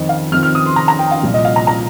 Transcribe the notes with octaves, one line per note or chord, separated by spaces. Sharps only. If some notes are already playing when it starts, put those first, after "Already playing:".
Already playing: F2 D#3 C4 D#4 D#5
F5
F2 D#3 C4 F6
F6
D#6
C6
A#5
A#5
G5
F5
C2 A#2 F3
D#5
F5
A#5
A#5